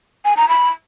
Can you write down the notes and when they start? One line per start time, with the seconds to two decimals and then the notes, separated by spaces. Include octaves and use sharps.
0.25 G#5
0.37 A#5
0.49 B5